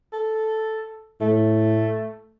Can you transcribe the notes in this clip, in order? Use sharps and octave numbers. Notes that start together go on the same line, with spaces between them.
A4
A2 A3